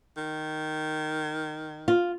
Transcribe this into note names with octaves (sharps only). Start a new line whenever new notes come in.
D#3
F4